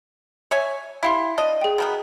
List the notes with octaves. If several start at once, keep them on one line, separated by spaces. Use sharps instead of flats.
C#5 E5 G#5
E4 G4 E5 F5 C6
D4 D#5
G#4 G5
B2 D#3 B3